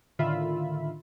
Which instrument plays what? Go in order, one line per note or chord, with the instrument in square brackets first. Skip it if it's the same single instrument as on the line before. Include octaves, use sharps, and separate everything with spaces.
[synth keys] A2 D3 D#3 F4 E5 B5